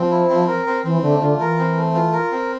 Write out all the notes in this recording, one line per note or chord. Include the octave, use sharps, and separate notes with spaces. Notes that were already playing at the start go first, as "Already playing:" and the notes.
Already playing: F3 C4
E4
C4
A#4
C4
E3 C4
D3 A3
D3 F4
E3 A#4
C4
A3
F4
A#4
C4